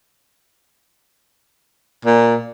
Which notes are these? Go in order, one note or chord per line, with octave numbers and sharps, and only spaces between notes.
A#2